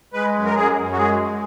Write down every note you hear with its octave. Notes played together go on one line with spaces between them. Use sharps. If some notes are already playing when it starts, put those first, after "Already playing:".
G#3 B4
F#2
A#4
F#2 G#4
F#2
F#4
G#3 G#4
G#3